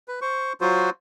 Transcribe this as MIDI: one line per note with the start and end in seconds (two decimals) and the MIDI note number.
0.08 0.20 71
0.22 0.53 72
0.22 0.53 85
0.61 0.90 54
0.61 0.90 65
0.61 0.90 66
0.61 0.90 72